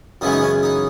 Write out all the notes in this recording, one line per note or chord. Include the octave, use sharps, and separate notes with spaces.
F#2 C#3 E3 G#3 B3 D#4
D#4
C#4
D#4